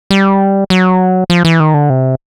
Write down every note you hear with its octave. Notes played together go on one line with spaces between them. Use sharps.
G3
F#3
F3
E3
D#3
D3
C3